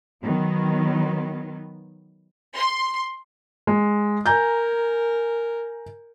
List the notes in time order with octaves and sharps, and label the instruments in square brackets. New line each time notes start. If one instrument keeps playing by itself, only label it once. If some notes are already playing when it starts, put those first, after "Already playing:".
[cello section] D#3 F#3 B3
[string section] C6
[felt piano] G#3
[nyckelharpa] A#4 [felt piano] G#5 A#5 G6